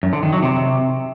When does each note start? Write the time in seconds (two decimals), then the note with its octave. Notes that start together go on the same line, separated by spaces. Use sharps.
0.03 F#2
0.13 D3
0.23 D#3
0.33 F#3
0.42 C3